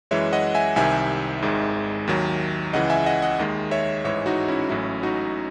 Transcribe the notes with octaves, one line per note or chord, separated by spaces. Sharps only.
F#2 E3 G#3 C#5 E5
D#5 F#5
E5 G#5
C2 C3 D#3 E5 G#5
G#1 G#2 D#3 G#3
D#2 D#3 F#3
C#2 C#3 E3 D#5 F#5
E5 G#5
D#5 F#5
D#5 F#5
D#2 D#3 G#3
C#5 E5
A1 G#2 E3 G#3 C#5 E5
D#4 F#4
C#4 E4
A1 A2 F#3 C#4 E4
D#4 F#4